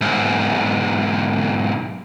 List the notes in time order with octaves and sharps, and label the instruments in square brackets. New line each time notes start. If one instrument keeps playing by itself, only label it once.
[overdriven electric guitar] B1 G#2